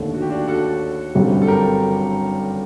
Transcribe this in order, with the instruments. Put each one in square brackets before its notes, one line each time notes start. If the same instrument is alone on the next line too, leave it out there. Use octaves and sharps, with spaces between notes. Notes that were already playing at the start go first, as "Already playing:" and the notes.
Already playing: [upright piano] D#2 D3 A3
[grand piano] F#4
G4
D4 F#4
F#4 A4
[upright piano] G1 F#2 D3 G3 C4
[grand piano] A4
G4 A#4